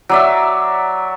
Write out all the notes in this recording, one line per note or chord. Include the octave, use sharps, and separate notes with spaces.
F#3 D5 E5